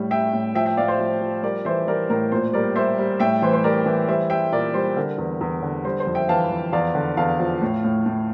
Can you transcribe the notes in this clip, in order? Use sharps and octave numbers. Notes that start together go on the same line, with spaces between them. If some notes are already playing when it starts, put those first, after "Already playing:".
Already playing: A2 G3
G3 E5 G5
A2
F3 E5 G5
E5 G5
A2 D5 F5
C5 E5
F3
F3
G3 A#4 D5
E3 C5 E5
G3 A#4 D5
A2 A#4
A#2 C5
G3 A#4 D5
G3 C5 E5
G3
A2 E5 G5
E3 C5
C5
G3 A#4 D5
E3
G3 C5 E5
G3 E5 G5
A#2 A#4 D5
G3 C5
D3 A#4
E2
E2
D3
G3 C5
C5
F2
E5 G5
E3 F5 A5
F2
E2 D5 F5
D3
E2 F5 A5
F3
A2
A2
A2